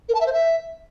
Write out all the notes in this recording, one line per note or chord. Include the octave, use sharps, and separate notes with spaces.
A#4
A5
E5
C5
E5